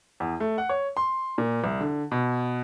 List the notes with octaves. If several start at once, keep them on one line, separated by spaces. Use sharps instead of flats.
E2
A3
F#5
C#5
C6
A#2
C2
D3
B2